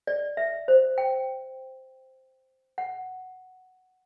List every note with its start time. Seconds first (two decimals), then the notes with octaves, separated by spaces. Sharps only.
0.07 D5
0.37 E5
0.68 C5
0.98 G5
2.78 F#5